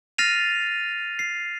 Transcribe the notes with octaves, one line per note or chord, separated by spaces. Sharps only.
F6 A6 A#6 C7 D#7 F7
C7